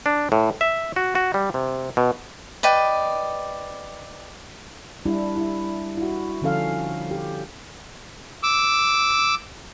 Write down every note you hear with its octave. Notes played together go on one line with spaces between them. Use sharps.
D4
A2
E5
F#4
F#4
G3
C3
B2
B4 D5 D#5 G5
G3 D4 E4
E4
E4 F#4
D3 F3 C#4 A4 F5
G4
D6 E6